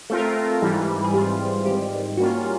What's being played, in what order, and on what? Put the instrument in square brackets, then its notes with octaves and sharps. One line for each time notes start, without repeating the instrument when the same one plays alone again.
[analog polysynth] A3 C4 F4 A#4 [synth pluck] A4
[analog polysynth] G#2 E3 G3
[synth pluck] G#4
[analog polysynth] G#2 E3 G3 C4 F4 [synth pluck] G4
[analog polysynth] G#2 D#3 G3 [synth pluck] G4
[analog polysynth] G3 A#3 C#4 F4 [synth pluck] F#4